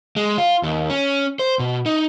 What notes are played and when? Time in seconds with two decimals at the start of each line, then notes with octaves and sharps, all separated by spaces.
0.16 G#3
0.38 F4
0.63 D#2
0.90 C#4
1.39 C5
1.59 B2
1.86 D#4